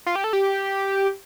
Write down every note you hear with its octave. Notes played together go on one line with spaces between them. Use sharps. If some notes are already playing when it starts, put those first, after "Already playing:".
F4
G4
A4
G4